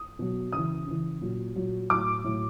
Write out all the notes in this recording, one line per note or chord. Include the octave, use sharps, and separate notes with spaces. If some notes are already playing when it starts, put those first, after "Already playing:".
Already playing: D#6
B2 F#3
C#3 E3 D#6
C#3 E3
A#2 F#3
A#2 F#3
A2 F#3 D6
A2 F#3